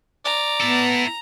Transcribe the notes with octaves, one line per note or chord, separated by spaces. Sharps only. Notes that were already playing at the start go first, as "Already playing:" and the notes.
D5 A#5
B3 E4 A4